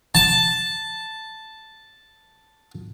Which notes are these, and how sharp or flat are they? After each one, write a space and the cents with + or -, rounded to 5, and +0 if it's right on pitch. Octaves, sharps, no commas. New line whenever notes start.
A5 +0